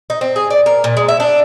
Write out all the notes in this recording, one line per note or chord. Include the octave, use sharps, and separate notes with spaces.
D#4
C4
G#4
D5
A#4
A#2
G#3
E5
D4